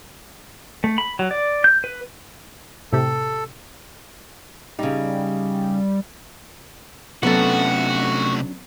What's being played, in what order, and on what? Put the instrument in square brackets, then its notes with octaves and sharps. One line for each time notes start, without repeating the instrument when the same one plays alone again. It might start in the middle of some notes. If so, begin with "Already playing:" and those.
[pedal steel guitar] A3
B5
F#3
D5
G6
B4
[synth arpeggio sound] A2 C3 G4 [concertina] A4
[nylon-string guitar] C#3 D#4 [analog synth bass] G3
[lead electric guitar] C3 A3 [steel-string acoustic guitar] F#3 C#4 D4 [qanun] B3 A4 [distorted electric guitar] F#4